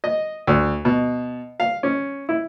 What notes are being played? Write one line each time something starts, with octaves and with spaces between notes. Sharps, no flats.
D#5
D2
B2
F5
C#4
E4